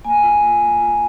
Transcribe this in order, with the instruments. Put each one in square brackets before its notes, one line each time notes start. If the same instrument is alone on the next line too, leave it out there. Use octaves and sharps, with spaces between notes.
[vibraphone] A#3 G#5
F4
A#3
A#3
F4